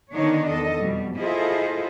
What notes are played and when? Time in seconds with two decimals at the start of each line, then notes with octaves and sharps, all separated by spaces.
0.14 D3 D#3 B3 D4 D#4 C#5
0.48 E2 A4 D#5
0.79 F2 B2 G3
1.19 E4 F4 G#4 A4 C5 D#5